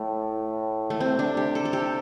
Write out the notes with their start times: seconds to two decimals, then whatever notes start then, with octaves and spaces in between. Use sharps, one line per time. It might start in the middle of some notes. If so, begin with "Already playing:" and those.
Already playing: A2 A3
0.90 A3
1.00 C3 C4
1.19 D4
1.37 G4
1.55 A4
1.65 A4
1.73 G4